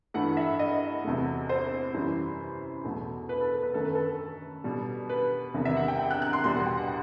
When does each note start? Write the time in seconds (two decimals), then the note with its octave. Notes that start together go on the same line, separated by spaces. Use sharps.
0.14 G2 E3 A3 F#5
0.37 E5
0.59 D#5
1.04 E2 C3 F#3 A3
1.49 C5
1.94 F#2 E3 G3
2.84 E2 B2 F#3 A3
3.29 B4
3.41 A4
3.51 B4
3.63 B4
3.74 F#2 D#3 A3 A4
3.85 B4
3.95 A4
4.64 B2 G3
5.09 B4
5.54 E2 C3 D#3 G3
5.65 E5
5.76 F#5
5.88 G5
5.99 G5
6.11 F#6
6.22 F#6
6.33 C6
6.44 E2 B2 G3 C6
6.56 F#5
6.66 G5
6.77 F#5